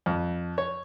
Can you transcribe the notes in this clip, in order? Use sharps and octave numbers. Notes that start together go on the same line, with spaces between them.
F2
C#5